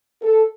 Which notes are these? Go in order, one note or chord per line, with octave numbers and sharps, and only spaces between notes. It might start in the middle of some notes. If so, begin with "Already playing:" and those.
A4